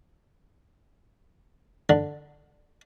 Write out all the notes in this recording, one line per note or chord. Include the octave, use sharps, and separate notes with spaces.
D3